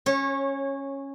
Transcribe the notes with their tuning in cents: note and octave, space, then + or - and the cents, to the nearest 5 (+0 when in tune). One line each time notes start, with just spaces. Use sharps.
C#4 -10 C#5 -25